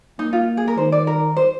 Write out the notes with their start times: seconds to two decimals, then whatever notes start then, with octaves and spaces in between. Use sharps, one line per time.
0.19 A#3 D#4
0.33 F4
0.57 G#4
0.68 A#4
0.77 D#3 C5
0.92 D5
1.07 A#4
1.37 C5